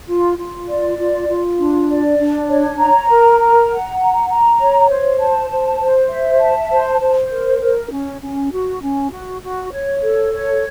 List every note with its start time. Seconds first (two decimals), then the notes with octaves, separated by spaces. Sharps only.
0.08 F4
0.38 F4
0.68 D5
0.98 F4
1.28 F4
1.59 D4
1.89 D5
2.19 D4
2.49 C#5
2.79 A#5
3.09 A#4
3.40 A#5
3.69 F#5
4.00 A#5
4.29 A#5
4.60 C#5
4.90 C5
5.20 A5
5.51 C5
5.80 C5
6.10 E5
6.41 A5
6.71 C5
7.00 C5
7.31 A#4
7.61 A#4
7.91 C#4
8.22 C#4
8.51 F#4
8.82 C#4
9.12 F#4
9.42 F#4
9.72 C#5
10.02 A4
10.32 C#5